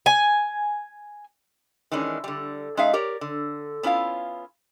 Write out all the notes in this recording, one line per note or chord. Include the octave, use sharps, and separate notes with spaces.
G#5
D#3 E3 G#3 C#4 D4
D3 G3
G#3 C#4 D#4 G#4 E5 F5
G4 A#4 C#5 D5
D3
B3 C#4 E4 F4 F5